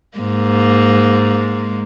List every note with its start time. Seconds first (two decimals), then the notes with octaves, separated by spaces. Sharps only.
0.18 G#2 G#3 A#3